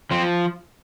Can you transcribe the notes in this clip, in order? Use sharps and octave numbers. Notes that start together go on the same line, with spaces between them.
F3 C4